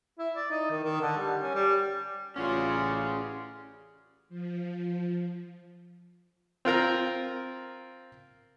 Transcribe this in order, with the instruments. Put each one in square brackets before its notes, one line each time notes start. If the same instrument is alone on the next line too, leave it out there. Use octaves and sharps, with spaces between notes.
[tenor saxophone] E4
D5
D#4
D#3
D#3
D3
G3
C#4
G3
[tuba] A1 [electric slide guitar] C#4 G#4 [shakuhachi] F4 [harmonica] F#4 D5 F6
[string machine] F3
[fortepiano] C4 F4 A#4 A#5